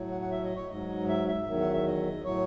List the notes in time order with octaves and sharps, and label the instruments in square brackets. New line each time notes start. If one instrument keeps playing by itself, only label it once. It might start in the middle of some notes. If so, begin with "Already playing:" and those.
Already playing: [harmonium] A2 F#3
F#5
F#5
E5
D#5
C#5
G#2 F#3 D#5
E5
E5
E2 D#3 F#3
F#5
E5
D#5
A2 F#3 C#5